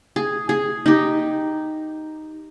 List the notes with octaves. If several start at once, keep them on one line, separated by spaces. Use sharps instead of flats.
G#4
G#4
D#4 G4